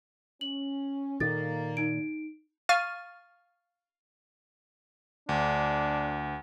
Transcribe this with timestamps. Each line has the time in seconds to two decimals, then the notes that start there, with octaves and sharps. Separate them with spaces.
0.41 C#4 F#7
1.20 A#2 D#3 A#3 A4 A6
1.77 D#4 D7
2.69 F5 C#6 F6 A6 D#7
5.29 D2 D4